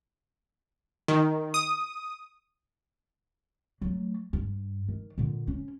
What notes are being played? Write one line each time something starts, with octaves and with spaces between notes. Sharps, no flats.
D#3
D#6
F#3 A3
G2
D#3
A#2 D3
C#4